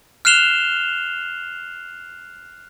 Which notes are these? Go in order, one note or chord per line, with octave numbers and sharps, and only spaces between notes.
F6 F#6 C7 E7 F7 G7